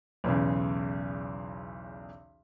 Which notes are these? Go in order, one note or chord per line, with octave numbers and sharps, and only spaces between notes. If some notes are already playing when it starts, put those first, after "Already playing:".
B1 E2 C#3